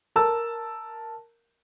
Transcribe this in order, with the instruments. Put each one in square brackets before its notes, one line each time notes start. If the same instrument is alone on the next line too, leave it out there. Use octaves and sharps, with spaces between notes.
[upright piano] A#4 A5 E6